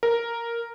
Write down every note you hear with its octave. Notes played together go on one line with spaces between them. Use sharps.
A#4